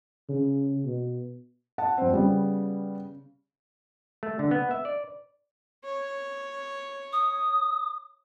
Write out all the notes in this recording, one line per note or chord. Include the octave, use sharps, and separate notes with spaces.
C#3
B2
F#5 A5
F2 C4
C#3 G3 B3
A3
D3
B3
E5
D5
C#5
D#6